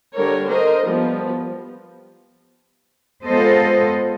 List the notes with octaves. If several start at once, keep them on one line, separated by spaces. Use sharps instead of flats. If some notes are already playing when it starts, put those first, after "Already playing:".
D3 G3 A#4 C#5
A#4 C5 D#5
F3 G3 B3
G#3 B3 F4 A4 C5 D#5